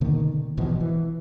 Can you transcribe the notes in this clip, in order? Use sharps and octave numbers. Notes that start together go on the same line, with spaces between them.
B2 D3 D#3 A#3
G#1 B2 E3 F3
E3